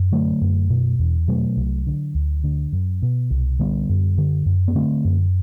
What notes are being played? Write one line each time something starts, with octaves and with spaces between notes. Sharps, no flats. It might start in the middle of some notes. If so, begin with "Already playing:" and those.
Already playing: F#2
D3 F#3 A3
F#2
B2
E2
B2 F#3 A3
C2
D3
D2
D3
F#2
B2
C2
D3 G3 B3
F#2
D3
F#2
B3
D3 A3 C4
F#2